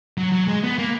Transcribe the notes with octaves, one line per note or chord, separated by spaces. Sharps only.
F#3
F#3
G#3
B3
A#3